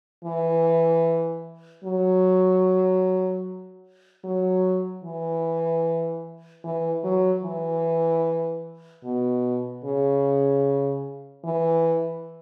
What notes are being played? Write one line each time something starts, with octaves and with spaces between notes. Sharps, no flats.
E3
F#3
F#3
E3
E3
F#3
E3
B2
C#3
E3